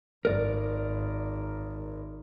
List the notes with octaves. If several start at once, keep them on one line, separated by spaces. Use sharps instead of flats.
G#1 A#4 D5